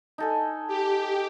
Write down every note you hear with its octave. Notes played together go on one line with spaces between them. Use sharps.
D#4 A4 G#5
G4